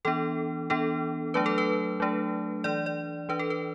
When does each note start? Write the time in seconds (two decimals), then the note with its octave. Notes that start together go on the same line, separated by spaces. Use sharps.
0.05 E3 B3 D4 A4
0.70 E3 B3 D4 A4
1.34 F#3 A3 D4 B4
1.46 A4
1.58 B4
2.00 F#3 A3 D4
2.64 E3 D4 D5
2.86 D5
3.29 E3 D4 B4
3.39 A4
3.50 B4